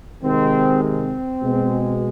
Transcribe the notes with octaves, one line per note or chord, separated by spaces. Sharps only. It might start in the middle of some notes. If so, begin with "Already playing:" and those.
C3 D#3 G#3 C4
C4
B2 G#3